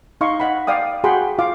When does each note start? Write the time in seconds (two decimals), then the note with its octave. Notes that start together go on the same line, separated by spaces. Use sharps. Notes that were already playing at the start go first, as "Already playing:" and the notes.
0.21 D#4 D#5 F5 C6 C#6
0.40 D#5 F#5 B5
0.67 D5 F5 G5 D#6
1.04 F#4 G#4 F#5 G5 B5 C6
1.39 F4 F5 D6